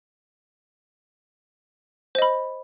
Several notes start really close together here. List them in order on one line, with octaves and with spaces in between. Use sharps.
C5 D#5 B5